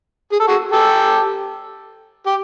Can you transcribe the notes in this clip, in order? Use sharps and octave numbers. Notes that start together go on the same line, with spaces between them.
G#4
A4
F#4 G#4
G4 A4
G4